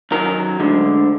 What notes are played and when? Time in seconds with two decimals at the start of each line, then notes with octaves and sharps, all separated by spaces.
0.11 F#2 D#3 F#3 A#4
0.60 D2 D3 G#3